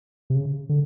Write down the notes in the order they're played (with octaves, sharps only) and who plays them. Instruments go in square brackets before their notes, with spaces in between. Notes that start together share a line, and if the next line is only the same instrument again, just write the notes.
[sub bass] C3
C#3
D3